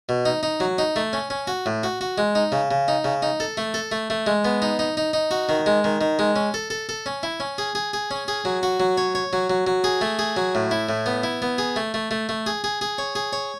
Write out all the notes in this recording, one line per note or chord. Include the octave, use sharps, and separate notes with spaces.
B2
D#4
D#4
F#3
D#4
A3
C#4
C#4
F#4
A2
F#4
F#4
G#3
D#4
C#3
C#3
D#4
C#3
D#4
A4
A3
A4
A3
A3
G#3
B3
D#4
D#4
D#4
D#4
F#4
D#3
G#3
D#3
D#3
G#3
C#4
A4
A4
A4
C#4
E4
C#4
G#4
G#4
G#4
C#4
G#4
F#3
F#4
F#3
C#5
C#5
F#3
F#3
F#3
G#4
A3
G#4
F#3
A2
E4
A2
B3
E4
B3
G#4
A3
A3
A3
A3
G#4
G#4
G#4
C#5
G#4
C#5